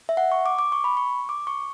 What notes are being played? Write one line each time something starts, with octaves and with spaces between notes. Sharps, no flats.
E5
F#5
C#6
D6
D6
C#6
B5
C#6
D6
C#6